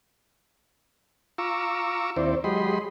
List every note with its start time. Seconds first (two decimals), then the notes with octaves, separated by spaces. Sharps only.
1.38 F4 A#5 C#6 D6 E6
2.16 D#2 C4 E4 C5 D5
2.44 F#3 G#3 G4 D#5 B5 C6